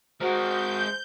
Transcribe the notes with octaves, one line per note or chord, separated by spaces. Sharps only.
G#3 F#4 A#4 C5 G6